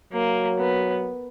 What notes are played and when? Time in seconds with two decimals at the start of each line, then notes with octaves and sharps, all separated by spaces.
0.12 F#3 A#3
0.59 B3